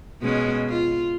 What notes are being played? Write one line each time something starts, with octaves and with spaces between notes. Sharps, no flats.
B2 G#3 C#4
F4